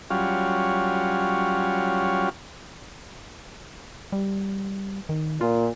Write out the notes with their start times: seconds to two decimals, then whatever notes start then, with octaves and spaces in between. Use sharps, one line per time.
0.10 F#3 G3 C#4 F4
4.12 G3
5.09 D#3
5.41 A#2 F4